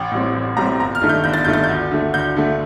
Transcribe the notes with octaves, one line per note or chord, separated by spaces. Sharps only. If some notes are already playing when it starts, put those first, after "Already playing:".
Already playing: A1 G5
A2 G3 C4
A1
A2 G3 C4 A#5
G1 A#5
F6
G2 D#3 A3
G6
G1 G6
A6
G2 D#3 A3 G6
A6
G6
D2
D3 A3
D2 G6
D3 A3